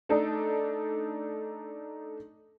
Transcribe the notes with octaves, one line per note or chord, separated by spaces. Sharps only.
A3 D4 D#4 A4 D5